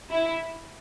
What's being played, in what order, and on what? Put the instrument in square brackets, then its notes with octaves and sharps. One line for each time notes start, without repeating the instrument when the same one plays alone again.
[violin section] E4